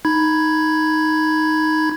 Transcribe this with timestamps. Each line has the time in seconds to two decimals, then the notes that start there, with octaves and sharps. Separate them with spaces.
0.05 D#4 B5 G#6